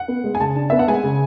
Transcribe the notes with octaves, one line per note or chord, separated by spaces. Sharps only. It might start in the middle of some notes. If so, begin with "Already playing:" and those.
Already playing: F#5
B3
G#3
G#5
C#3 A5
D4
B3 E5
F#5
G#3 G#5
C#3